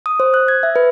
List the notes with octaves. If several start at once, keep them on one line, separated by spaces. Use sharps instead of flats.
D#6
C5
F#6
G#6
E5
B4